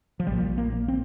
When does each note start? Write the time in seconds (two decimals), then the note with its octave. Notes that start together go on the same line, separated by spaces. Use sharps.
0.20 F3
0.27 A#1 A#2 G3
0.38 F3
0.58 A#3
0.88 C4